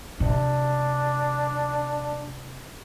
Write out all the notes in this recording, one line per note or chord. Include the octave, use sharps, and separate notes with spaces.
C3 D4